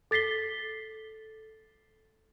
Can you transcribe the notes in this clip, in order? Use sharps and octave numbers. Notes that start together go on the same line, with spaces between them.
A4 A6 B6 C7 G7